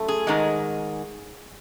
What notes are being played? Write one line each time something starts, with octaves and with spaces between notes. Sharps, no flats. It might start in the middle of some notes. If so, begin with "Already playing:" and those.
Already playing: F#2 A3
G#4
G#2 D#3 G#3